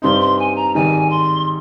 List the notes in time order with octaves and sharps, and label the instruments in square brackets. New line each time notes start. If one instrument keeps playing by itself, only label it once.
[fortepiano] G2 G3 C4 D#4 [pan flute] C6
[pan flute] C6
G#5
A#5
[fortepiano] G#1 G#2 G3 [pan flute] G#5
[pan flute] C6